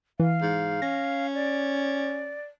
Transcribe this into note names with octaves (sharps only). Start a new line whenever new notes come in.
E3 F5
G#2
C#4 A#6
D5